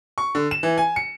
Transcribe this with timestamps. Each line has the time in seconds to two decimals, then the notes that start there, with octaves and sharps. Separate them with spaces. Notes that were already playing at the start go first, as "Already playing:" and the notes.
0.18 C#6
0.35 D3
0.51 E7
0.63 E3
0.78 G#5
0.96 C#7